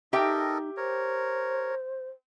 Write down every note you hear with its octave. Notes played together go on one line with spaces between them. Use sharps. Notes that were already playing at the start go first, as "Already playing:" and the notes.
D#4 G4 A4 A#4 D#5 E5 G5
A#4 C5 C#5